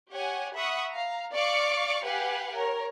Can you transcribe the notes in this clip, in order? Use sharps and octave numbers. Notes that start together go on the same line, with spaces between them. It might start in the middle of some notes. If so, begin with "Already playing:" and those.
G4 C#5 F#5 G#5
E5 F#5 B5 C#6 D#6
F5 A#5
D5 F5 C#6 D6 C#7
G4 B4 F5 F#5 G#5
A#4 C#5